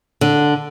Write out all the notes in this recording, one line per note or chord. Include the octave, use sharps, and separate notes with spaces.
D3